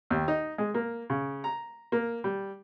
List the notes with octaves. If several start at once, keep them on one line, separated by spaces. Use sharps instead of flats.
D#2
D#4
G#3
A#3
C#3
A#5
A#3
G3